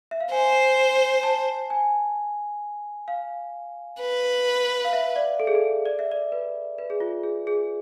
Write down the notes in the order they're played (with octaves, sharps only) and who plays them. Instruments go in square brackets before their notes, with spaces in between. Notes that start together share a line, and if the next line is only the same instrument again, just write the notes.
[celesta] E5
F5
[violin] C5 [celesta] G#5
[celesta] A5
G#5
F5
[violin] B4
[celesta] F5
E5
D5
A4
G#4
A4
D5
E5
D5
B4
B4
G#4
F4
G#4
G#4